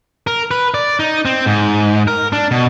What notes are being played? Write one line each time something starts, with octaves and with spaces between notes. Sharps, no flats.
A#4
B4
D5
D#4
C4
G#2
A#4
D4
B2